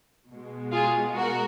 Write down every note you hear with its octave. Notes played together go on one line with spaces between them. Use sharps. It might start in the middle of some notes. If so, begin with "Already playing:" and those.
B2 G#3
F4 G#4
F#4 A#4